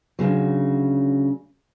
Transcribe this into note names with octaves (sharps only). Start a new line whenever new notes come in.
D2 A#2 C#3 F#3